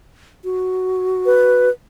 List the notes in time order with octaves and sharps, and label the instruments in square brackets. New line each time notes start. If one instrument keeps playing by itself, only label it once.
[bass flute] F#4
[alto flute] B4